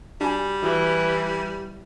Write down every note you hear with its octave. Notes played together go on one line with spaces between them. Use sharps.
G3 D4 F#4 G#5
E3 F#4